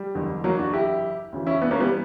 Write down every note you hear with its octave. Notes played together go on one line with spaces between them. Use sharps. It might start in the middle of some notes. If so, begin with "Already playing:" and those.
Already playing: G3
F#1 E2 D3
F#3 A#3
D4 F#4
E4 G4
D2 C#3 E3
C#4 E4
B3 D4
A#3 C#4
G3 B3